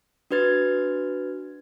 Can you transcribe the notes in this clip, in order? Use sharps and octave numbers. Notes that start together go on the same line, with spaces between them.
D4 F#4 B4 G#6 A6